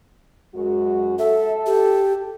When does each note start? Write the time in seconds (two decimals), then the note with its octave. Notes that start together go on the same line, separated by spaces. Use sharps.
0.55 F#2 G#3 F#4
1.19 A4 E5
1.66 G4